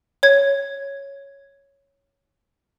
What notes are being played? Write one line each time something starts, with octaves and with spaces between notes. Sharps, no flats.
C#5 G#6